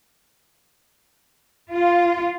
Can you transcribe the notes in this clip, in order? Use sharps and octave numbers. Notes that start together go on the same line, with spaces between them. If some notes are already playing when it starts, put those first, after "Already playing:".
F4